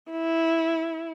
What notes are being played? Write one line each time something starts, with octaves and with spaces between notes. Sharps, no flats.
E4